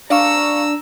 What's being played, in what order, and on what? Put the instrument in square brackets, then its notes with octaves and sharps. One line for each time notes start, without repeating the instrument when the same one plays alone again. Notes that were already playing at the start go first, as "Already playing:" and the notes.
[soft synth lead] D4 [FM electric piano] D5 F5 C#6 [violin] A#5 E6